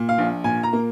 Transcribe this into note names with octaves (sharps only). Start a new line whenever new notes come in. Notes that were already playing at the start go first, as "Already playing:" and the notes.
Already playing: A#2
F5
A#1
A#2 G#5
A#5
A#3